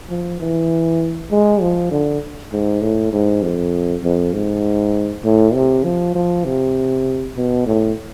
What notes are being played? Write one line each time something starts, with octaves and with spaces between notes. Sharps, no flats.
F3
E3
G#3
F3
D3
G#2
A2
G#2
F2
F2
G#2
A2
C3
F3
F3
C3
B2
A2